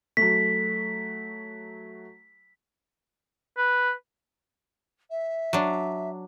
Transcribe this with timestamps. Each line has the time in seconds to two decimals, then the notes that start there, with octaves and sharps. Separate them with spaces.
0.17 F#3 A3 B6
3.57 B4
5.10 E5
5.53 F#3 D4